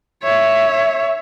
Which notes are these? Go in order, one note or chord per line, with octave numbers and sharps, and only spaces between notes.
C#5 E5